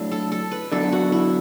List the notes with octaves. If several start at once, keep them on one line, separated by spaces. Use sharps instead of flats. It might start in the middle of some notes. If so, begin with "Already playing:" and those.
Already playing: A2 F#3 D4 E4
A4
A4
B4
E2 D3 F#3 D4 A4
F#4
E4